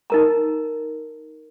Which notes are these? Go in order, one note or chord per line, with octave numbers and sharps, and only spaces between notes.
D#4 A#4 A#5